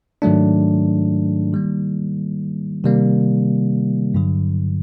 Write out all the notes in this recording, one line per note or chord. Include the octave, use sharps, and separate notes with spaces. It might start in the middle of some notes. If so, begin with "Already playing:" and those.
G#2 D#3 F#3 A3 D4
D#3 G3 A#3
C3 D#3 G3 A#3
G2 D3 F#3